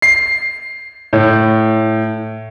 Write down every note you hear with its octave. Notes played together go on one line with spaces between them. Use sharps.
C7
A2